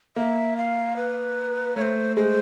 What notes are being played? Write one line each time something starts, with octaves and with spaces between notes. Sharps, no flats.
A#3 E5
F5
B4
A3 C#5
C5
G#3 C5